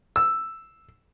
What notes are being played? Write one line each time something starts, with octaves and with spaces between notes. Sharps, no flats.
E6